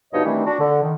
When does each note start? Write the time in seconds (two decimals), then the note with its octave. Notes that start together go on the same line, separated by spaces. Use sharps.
0.13 G2 B2 F3 D#4 C#5 D#5
0.25 D#3 E3 G3 A3 C4 D4
0.46 D4 F#4
0.60 D3
0.83 D#3